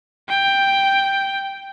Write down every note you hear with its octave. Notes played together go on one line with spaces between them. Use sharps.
G5